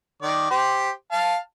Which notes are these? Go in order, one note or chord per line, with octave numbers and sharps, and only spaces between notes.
D#3 D5
G4 C5
F5 A5